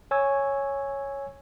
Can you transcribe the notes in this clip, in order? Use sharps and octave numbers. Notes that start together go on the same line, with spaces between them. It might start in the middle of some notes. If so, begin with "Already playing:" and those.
C#5 G#5 C#6 E6 G#6